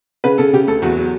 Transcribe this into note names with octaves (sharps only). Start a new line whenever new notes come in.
C#3 B4
C#3 A4
C#3 G4
D2 A4
E2 F#4
F#3